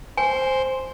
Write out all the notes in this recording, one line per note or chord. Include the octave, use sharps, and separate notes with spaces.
C5 G#5